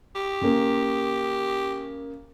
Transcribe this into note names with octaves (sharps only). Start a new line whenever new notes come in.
G4
C#3 A#3